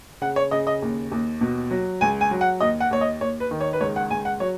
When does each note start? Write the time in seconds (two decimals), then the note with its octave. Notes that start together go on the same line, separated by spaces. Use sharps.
0.21 C#3 F#5
0.36 C#5
0.51 C#3 D#5
0.67 D#5
0.82 D#2
1.12 D#2
1.41 B2
1.71 F#3
2.01 C#2 G#5
2.21 G#5
2.31 F#3
2.41 F#5
2.60 D#2 D#5
2.80 F#5
2.91 D#2 C#5
3.01 D#5
3.20 D#2 C#5
3.40 B4
3.51 D#3
3.61 C#5
3.73 B4
3.80 C#2 C#5
3.96 F#5
4.11 C#2 G#5
4.25 F#5
4.40 F#3 C#5